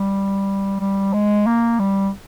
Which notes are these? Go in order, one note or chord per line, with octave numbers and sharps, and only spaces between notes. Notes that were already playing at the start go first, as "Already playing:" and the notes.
Already playing: G3
G3
G#3
A#3
G3